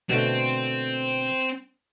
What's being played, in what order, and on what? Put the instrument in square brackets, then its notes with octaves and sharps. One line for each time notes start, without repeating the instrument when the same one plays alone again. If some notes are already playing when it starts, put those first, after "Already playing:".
[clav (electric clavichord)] B2 D3 A3 [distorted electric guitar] C4